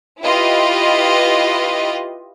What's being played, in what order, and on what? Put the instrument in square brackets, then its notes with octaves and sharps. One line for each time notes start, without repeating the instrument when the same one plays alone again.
[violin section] E4 F4 G4 B4 D#5